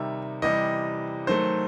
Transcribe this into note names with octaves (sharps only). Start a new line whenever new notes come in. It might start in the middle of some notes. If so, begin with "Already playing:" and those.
Already playing: C3 D#3 G3 D#4 E5
C3 E3 G3 D#5
D#3 F#3 A3 C5